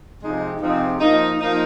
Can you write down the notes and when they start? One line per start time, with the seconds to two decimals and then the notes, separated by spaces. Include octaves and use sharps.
0.21 C3 F3 G#3 C4 D#4
0.60 C3 F3 G#3 C4 D#4
0.99 F3 A#3 D#4
1.38 F3 A#3 D#4